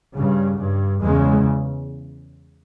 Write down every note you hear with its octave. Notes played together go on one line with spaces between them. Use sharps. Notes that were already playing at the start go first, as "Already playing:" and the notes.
G2 C#3
G2
E2 C#3 G#3